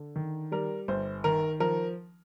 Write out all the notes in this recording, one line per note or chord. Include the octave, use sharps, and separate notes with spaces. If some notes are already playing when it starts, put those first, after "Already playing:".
Already playing: D3
D#3
G3 A#4
G1 C5
D#3 A#4
F3 A#4